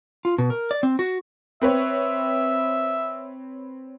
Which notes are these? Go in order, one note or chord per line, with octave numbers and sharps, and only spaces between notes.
F4
B2
A#4
D5
C4
F#4
C4 B4 C#5 E5